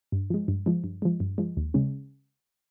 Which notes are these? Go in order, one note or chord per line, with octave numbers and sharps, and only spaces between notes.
G2
F3 G#3
G2
F3 G#3
G2
F3 G#3
G2
F3 G#3
D#2
C#3 G#3 C#4